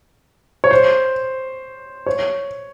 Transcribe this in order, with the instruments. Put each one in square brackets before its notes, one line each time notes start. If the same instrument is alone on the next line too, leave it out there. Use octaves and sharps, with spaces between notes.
[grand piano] C#5
C5
C#5